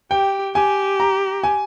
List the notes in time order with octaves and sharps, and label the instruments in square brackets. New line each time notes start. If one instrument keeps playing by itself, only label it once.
[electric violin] G4 [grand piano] G5
[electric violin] G4 [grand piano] G#5
[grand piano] A#5
G#5